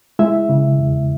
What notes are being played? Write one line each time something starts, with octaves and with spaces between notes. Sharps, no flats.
G#3 E4 E5
C#3
E2